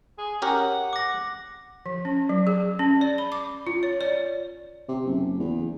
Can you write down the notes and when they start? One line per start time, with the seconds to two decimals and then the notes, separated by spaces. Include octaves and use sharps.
0.18 G#4
0.42 C#4 G4 A#4 F#5
0.93 D6 A#6
1.86 F3
2.05 C#4
2.29 F#3
2.47 G#4
2.79 C#4
3.01 D5
3.18 B5
3.32 D6
3.67 F4
3.83 C#5
4.01 D5
4.88 C3
5.05 F#1
5.40 E2